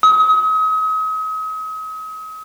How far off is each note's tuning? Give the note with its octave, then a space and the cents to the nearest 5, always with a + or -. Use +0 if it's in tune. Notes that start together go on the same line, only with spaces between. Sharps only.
D#6 +40